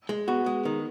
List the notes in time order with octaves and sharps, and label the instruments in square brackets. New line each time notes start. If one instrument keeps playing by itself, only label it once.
[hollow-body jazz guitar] G#3
[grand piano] B3 [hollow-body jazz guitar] F#4
[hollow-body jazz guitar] G#3
D#3